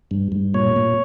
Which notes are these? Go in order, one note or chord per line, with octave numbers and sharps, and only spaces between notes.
G2
G2
A#2 C#5
A#2